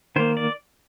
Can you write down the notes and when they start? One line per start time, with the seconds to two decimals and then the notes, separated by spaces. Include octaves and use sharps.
0.16 D#3 A#3 C5
0.37 D5